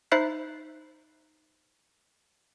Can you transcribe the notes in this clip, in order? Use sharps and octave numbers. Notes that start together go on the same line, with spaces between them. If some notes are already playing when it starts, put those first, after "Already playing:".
D#4 C5 E5 B5 F#6 C7